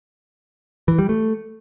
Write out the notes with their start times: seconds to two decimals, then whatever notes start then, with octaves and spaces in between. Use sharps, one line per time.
0.88 E3
0.99 G3
1.09 A3